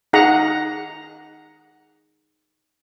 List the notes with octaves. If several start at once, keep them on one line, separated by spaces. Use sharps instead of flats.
D#4 G#4 F#5 A#5